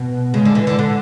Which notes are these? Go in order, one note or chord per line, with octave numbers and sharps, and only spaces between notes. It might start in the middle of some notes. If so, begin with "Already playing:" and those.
Already playing: B2
C#3 G#3
D3
E3
D3
D3